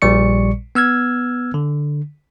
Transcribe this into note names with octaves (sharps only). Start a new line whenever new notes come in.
A#1 A#2 G3 D5 C#6 C#7
B3 E6 F6 G#6
D3